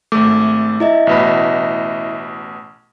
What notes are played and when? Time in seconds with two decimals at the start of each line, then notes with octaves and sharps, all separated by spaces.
0.12 G#1 A3 D6
0.80 E4 D#5 E5
1.07 A1 B2 B5